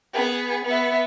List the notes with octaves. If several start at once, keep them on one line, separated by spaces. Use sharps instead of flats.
B3 G#4
B3 E5